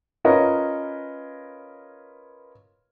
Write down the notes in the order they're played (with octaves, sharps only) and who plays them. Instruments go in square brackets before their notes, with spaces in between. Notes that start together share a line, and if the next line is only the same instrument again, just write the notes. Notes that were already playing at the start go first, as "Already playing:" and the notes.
[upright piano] C#4 F4 A#4 B4 C#5 D#5